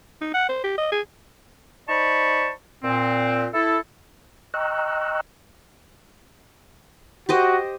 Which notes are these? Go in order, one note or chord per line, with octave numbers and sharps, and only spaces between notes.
D#4
F#5
C5
G4
D#5
G#4
D#4 C5 D5 A5 B5 C#6
A#2 C4
E4 A4
D#5 G5 A#5 C#6 E6 F#6
F#4 G4 C5 D#5